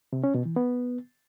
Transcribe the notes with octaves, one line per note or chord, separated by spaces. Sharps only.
C3
C#4
B2
E3
B3